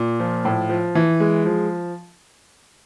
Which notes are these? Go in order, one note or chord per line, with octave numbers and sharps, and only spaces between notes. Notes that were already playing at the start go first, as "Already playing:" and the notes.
Already playing: A#2
F3
A2
F3
E3
G#3
F3